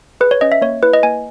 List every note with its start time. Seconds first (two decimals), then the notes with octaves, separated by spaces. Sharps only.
0.21 G#4 B4
0.31 C#5
0.41 C#4 D#5
0.52 E5
0.62 A#3 C#5
0.83 E4 B4
0.94 D#5
1.03 A#3 G#5